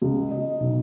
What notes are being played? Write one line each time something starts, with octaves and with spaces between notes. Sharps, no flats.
C#2
D#5
B1